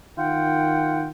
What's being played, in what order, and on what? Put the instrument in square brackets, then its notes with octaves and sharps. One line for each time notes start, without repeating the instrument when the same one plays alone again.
[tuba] D#3 [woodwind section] F4 F#5 G5